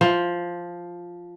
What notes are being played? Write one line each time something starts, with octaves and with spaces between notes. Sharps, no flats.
F3